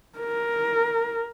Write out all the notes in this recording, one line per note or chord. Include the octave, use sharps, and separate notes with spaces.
A#4